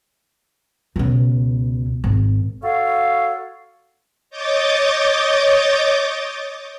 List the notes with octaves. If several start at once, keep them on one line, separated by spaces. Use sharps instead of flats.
C#2 B2
G#1
F#4 A4 C#5 F5
C#5 D#5 D6 G6 A6